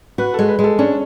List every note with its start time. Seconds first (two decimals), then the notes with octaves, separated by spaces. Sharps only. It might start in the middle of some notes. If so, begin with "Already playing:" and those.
0.18 F#4 B4
0.34 G#3 A4
0.48 B4
0.59 G#3
0.64 A4
0.79 C#4 D4